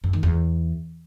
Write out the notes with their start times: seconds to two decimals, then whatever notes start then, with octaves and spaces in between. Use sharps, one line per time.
0.04 F#2
0.13 D#3
0.23 E2